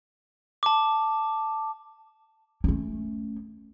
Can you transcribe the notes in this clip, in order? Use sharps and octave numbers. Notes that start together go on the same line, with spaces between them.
A5 D6
A3 C#4